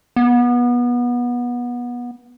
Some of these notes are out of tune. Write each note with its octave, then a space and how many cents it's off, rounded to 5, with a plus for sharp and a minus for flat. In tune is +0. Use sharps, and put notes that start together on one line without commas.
B3 -25